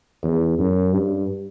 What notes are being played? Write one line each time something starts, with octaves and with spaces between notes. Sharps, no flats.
E2
F#2
G2